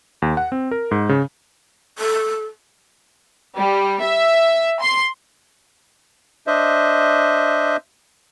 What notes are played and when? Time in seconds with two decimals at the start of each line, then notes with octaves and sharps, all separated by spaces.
0.22 D#2
0.37 F#5
0.52 C4
0.71 A#4
0.91 G#2
1.09 C#3
1.99 A4
3.58 G3
4.03 E5
4.82 C6
6.47 D4 C5 D#5 E5